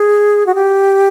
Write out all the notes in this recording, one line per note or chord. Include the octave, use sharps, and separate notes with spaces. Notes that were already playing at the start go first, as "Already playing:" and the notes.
Already playing: G#4
F#4
G4